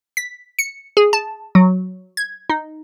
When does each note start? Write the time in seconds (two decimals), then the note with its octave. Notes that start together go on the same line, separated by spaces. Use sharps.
0.17 B6
0.59 C#7
0.97 G#4
1.13 A5
1.55 F#3
2.17 G#6
2.49 D#4